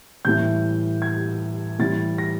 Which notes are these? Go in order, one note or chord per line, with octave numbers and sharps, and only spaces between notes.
A2 E3 G3 G6
G#6
A2 E3 G3 A6
A#6